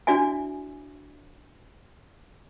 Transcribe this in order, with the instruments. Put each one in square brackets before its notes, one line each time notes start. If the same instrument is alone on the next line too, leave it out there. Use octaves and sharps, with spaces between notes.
[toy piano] D4 E4 F#4 D5 E5 G#5